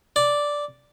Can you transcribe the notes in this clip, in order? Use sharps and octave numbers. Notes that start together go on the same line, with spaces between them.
D5